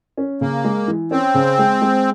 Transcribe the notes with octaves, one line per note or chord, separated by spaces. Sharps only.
C#4
C#3 A#3
G#3
E3
C4 C#4
C#3
G#3
G#3